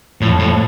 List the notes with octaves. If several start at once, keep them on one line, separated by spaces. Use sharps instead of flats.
F2 A2
A2